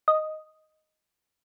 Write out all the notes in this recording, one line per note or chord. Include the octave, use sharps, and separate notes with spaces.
D#5